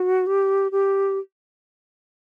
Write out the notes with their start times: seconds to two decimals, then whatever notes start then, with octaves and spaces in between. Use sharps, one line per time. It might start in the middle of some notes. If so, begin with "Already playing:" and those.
Already playing: F#4
0.27 G4
0.72 G4